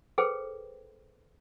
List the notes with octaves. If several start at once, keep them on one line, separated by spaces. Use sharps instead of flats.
G#4 A4 B4 C5 G5